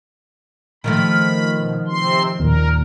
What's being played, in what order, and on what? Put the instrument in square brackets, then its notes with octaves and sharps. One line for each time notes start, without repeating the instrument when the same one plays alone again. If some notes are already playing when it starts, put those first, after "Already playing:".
[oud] D#3 F3 A3 [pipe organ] B5
[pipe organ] B2
C3 C4 C6
[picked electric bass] D#2 A#2 [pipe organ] A#4